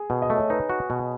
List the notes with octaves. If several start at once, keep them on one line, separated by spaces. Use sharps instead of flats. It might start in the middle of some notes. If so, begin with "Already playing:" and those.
Already playing: G#4
B2
D#5
A3
C#5
D#4 B4
F#4
B2